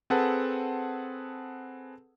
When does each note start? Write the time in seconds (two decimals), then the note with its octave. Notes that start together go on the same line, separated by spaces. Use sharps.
0.10 C4 G#4 A4 B4 F#5 A5